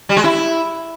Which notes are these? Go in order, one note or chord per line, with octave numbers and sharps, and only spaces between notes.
G3
G#3
E4